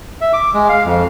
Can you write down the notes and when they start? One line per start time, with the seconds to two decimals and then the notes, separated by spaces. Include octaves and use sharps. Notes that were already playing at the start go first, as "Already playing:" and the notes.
0.21 E5
0.33 D6
0.54 G#3
0.69 F5
0.86 F2